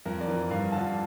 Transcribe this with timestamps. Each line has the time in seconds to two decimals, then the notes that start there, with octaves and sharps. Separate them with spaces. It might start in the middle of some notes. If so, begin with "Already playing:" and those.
0.06 F2 A#4
0.21 D5
0.28 E3
0.50 G2 F5
0.72 D3 F3 A5